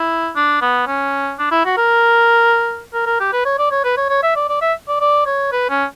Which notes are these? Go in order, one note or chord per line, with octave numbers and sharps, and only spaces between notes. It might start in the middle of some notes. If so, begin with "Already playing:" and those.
Already playing: E4
D4
B3
C#4
D4
E4
F#4
A#4
A#4
A#4
G4
B4
C#5
D5
C#5
B4
C#5
C#5
E5
D5
D5
E5
D5
D5
C#5
B4
C#4